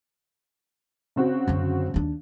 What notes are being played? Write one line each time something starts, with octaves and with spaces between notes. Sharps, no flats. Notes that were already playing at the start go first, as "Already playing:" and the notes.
C#3 C4 F#4
F#2 D3
D#2 D4